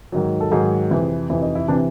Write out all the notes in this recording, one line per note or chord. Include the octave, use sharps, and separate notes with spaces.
G#2 D#3 F#3
A4
G#2 D#3 F#3 G#4
F2 C3 E3
F2 C3 E3 E4
D#4
E4
C3 E3 D4